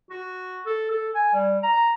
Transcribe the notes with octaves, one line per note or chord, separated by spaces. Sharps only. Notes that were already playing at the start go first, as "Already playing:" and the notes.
F#4
A4
A4
G#5
G3
A#5